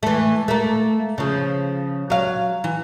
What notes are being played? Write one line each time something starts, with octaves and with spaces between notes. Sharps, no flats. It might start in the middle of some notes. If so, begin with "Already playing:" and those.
E3 A3
A3 A#3
C#3 F3
F#3 F5
E3